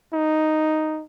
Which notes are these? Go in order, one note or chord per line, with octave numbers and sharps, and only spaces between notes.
D#4